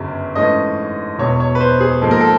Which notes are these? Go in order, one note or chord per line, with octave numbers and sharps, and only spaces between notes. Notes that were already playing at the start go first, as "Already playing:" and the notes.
Already playing: G1 F#2 C#3
G#2 E3 A3 C#4 D#5
E1 E2 B2 C#5
C#5
B4
C5
G#4
G#2 F3 A#3 A4
A#4
A4